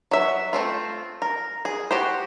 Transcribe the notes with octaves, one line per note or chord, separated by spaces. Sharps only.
F#3 E5
A3 C4 F4
A#4
G#4
F#4 G4 C5